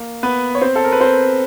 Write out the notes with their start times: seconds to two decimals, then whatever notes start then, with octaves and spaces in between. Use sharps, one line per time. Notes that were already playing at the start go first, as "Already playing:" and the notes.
Already playing: A#3
0.23 B3 B4
0.55 C#5
0.62 C4 C5
0.76 A4
0.84 A#4
0.92 B4
1.00 C4 C5